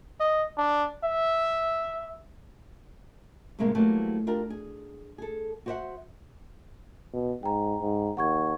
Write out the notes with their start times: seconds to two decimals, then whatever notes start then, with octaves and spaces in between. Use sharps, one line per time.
0.20 D#5
0.58 D4
1.04 E5
3.59 D2 A2 C3 G#3 A#3 C#4
3.75 E3 F#3 G3 A3 A#3 C4
4.27 D4 F4 G4 A#4
4.50 G#4
5.18 G#4 A4
5.66 F#4 G4 C5 D5 E5 F#5
7.13 B2
7.43 G#2 G5 A#5
7.82 G#2
8.17 D#2 F#5 C#6 G#6